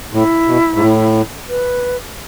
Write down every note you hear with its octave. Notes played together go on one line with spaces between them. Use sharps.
A2 E4
B2
G#2
A2
B4